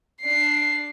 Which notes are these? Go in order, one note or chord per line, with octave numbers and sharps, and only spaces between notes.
D4 C7